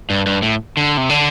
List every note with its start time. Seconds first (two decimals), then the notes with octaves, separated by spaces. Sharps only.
0.10 G2
0.26 G2
0.42 A2
0.77 D3
0.97 C3
1.09 D3